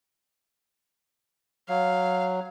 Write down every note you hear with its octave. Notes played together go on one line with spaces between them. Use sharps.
F#3 F5